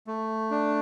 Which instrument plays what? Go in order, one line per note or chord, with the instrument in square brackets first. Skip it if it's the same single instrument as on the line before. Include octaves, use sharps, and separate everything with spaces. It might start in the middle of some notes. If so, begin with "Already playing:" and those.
[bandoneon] A3
D4